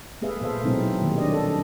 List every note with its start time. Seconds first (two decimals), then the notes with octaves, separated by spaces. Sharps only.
0.22 A3 B3 G#4 B4 E5 F5
0.41 A#2 A3 A4 C5 E5 F5
0.63 B2 F#3 G#3 C4 D#4 E4
1.02 D#3 G3 A#3
1.18 C#4 D4 D5 D#5
1.32 A4